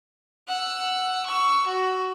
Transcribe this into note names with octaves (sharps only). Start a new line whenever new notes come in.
F#5 E6
C#6 E6
F#4